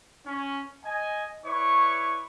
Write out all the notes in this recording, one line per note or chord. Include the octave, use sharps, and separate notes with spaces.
C#4
D#5 G#5
E4 B4 C#5 D5 C#6